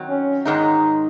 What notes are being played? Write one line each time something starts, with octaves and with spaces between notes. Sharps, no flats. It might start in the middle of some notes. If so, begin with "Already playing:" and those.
Already playing: D#3 F#3 C4
C#4
G#2 D#3 G#3 D#4